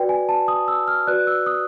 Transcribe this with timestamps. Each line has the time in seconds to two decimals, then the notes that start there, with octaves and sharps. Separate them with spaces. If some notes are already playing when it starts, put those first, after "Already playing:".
Already playing: F#4 B4 D5 G5
0.09 G#5
0.29 A5
0.48 D#6
0.68 E6
0.88 F6
1.07 F#4 B4 D5 F#6
1.27 E6
1.46 D#6